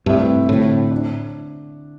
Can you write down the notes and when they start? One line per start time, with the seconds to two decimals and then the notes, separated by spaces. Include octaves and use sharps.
0.06 G2 C3 A3 C4 E4
0.48 A2 D3 C4 E4
0.91 D4